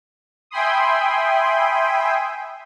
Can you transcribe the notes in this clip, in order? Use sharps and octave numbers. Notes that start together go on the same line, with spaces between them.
E5 G5 G#5 B5 C6 D#6